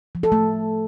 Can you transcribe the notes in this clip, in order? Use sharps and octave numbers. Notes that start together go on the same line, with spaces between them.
F3
A4
A3